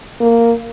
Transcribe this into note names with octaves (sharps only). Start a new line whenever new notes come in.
A#3